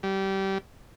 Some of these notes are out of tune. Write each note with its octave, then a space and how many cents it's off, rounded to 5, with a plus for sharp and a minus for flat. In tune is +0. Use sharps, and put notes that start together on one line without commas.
G3 -20